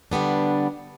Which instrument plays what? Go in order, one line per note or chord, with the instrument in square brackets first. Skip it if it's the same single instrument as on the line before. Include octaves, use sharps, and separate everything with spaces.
[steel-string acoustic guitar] D3 G3 B3 D4